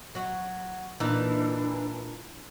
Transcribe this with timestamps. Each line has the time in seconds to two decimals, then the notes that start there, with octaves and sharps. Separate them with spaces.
0.15 F#3 F#4
1.00 A#2 E3 D4 D#4